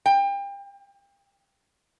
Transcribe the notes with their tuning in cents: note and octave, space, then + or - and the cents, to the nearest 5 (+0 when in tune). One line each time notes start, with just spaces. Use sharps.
G5 +30